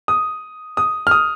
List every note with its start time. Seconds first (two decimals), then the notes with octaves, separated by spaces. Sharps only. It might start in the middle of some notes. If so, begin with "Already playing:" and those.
0.08 D#6
0.77 D#6
1.07 F6
1.11 D#6